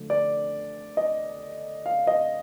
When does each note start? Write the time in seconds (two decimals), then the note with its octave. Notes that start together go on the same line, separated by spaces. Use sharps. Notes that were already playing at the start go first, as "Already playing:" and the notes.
Already playing: D3 F3 A3
0.10 D5
0.97 D#5
1.86 F5
2.07 D#5